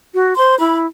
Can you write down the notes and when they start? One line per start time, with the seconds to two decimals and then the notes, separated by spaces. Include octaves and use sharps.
0.13 F#4
0.36 C5 C6
0.58 E4 B5